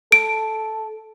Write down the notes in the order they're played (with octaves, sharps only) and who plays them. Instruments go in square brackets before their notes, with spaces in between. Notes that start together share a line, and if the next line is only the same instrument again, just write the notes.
[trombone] A4 [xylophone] D7